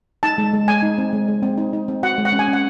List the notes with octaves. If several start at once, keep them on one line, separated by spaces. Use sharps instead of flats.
D#4 A5
G#3
G#3
G#3 G#5
D#4
C4
G#3
G#3
C4
D#4
D#4
C4
F#4 F#5
G#3
F#5
C#4
G#5
C#4
F#5